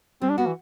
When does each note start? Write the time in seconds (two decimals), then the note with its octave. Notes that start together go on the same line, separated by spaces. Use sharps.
0.22 G3 C4
0.30 D4
0.38 B3 F#4
0.47 E3